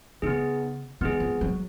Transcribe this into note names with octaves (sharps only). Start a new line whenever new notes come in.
C#3 B3 D#4 G#4
D#3 B3 D#4 G#4
F3
F#3